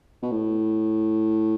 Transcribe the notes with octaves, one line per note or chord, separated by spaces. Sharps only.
B2
A2